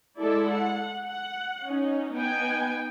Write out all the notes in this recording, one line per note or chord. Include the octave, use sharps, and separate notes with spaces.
G#3 E4 A4 D5
F#5
F#5
C#4 D#4
B3 D#4 G5 G#5